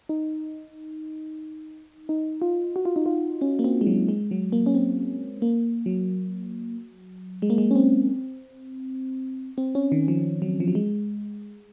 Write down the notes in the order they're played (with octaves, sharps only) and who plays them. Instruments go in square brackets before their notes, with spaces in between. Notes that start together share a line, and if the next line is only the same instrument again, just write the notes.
[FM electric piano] D#4
D#4
F4
F#4
F4
D#4
F4
C#4
A#3
C4
G#3
F#3
G#3
F#3
A#3
C#4
C4
A#3
F#3
G#3
A#3
G#3
C#4
C4
C4
C#4
D#3
F3
F#3
F3
F#3
G#3